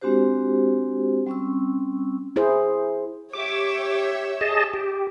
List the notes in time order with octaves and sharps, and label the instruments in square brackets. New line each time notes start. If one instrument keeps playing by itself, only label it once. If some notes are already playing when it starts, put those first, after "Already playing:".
[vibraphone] G#3 C4 D4 F#4 G4 C5
G3 C4 C#4 C#6 E6
[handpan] E4 G#4 C5
[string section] G4 C#5 E5 [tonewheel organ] D6
[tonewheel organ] G#4 D#5 A5
G4